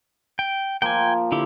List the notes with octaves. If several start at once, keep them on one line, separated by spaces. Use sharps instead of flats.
G5
F3 A#3 G5 G#5
D3 E4 G4